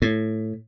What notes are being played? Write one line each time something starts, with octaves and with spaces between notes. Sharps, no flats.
A2